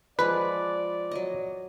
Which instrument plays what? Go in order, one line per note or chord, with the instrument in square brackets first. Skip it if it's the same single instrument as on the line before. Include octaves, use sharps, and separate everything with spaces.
[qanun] F3 G#3 [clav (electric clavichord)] B4 [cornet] D5
[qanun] F#3 D#5